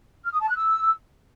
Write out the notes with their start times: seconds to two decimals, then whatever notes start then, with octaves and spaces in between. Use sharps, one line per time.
0.24 F6
0.32 D#6
0.40 A5
0.48 F#6
0.56 E6